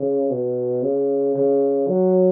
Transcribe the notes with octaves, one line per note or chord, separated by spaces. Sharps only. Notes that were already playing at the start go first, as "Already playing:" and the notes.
Already playing: C#3
B2
C#3
C#3
F#3